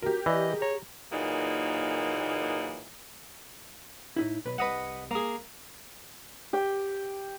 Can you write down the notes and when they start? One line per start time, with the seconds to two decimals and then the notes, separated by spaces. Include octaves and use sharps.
0.02 F#4 G4 A#4
0.26 E3 D5 D#5
0.49 G#4
0.62 C#5 A#5
1.11 A#2 E3 F#3 A#3 D#4 G#4
4.16 A2 D#4 E4
4.45 B1 B4 B5
4.58 C2 B4 D#5 F#5
5.11 A#3 G#4
6.53 G4 G5